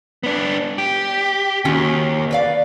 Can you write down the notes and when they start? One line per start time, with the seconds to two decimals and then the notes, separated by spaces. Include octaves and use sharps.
0.23 B3 D4
0.78 G4
1.65 D#2 C#4 F4 F#4
2.31 B4 D5 F5